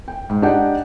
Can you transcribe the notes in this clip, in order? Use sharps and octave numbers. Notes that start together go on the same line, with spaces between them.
G5
G#2
D4 D#4 G4 F#5 G5